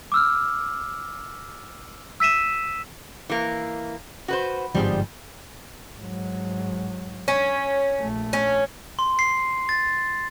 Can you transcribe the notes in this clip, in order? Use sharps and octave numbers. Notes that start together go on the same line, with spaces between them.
D6 E6 F6
E6 B6 D#7 E7
E3 A#3
F#4 B4 C5
G1 G#2 F3 G3 C4 G#4
G#2 F#3
C#4
A#1 A3
C#4
C6
C7
A6